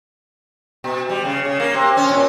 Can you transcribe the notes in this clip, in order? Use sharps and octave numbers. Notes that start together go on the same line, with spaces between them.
B2
G3
C#3
C#3
A#3
C3
C#4
A#2